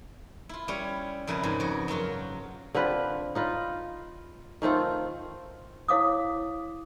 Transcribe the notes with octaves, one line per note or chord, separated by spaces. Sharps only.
E4 F4
G3 C#4 E4 C#5
F2 C#3 E4 A#4 B4
E2 G#2 E3
F2 F#4
F#2 F#3 F4 F#4
D3 C4 F4 B4
D#4 F4 B4
D#3 A3 C4 F4
E4 C#5 F5 D6 D#6